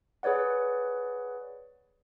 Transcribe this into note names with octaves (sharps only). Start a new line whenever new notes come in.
G#4 B4 C#5 D5 F#5